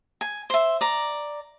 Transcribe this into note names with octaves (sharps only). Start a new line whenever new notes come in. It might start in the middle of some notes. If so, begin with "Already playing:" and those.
G#5
C5 E5
D5 A#5